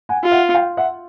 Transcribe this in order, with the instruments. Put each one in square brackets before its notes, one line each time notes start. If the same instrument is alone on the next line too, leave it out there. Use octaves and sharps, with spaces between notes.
[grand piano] F#5 G#5
[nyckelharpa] F4
[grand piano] E5 F#5
F5 G5
E5 F#5